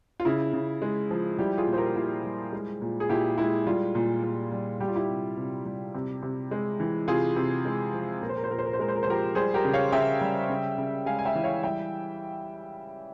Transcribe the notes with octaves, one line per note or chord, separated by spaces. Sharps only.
F4
C#3 E4
C#3
G#3
F3
G3 E4 G4
F4 G#4
A#2
C5
G4 A#4
A#2 E4 G4
G3
G#3
A#2
G#4
A#2 E4 G4
G#3 E4
G3 F4
A#2
A#2
G3
G3 G4
F4
E4 G4
C3
C3
G3
C3
C3
G#3
E3
C3 F4 G#4
C3
G#3
F3
A#2 A#4
C5
A#4
C5
A#2 A#4
C5
A#4
C5
G#3 A#4
C5
A#4
C5
F3 G4 A#4
G3 G#4 C5
G4 A#4
C#3
C#5 F5
C#3 E5 G5
G3
C#3
C#3
G#3 F5 G#5
G#5
E5 G5
E3
C#5 F5
G3 E5 G5